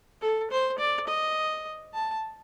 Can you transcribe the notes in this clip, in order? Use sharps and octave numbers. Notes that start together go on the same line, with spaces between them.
A4
C5
D5
D#5
A5